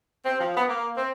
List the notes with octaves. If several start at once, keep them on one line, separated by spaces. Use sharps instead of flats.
C4
F3
B3
A#3
C4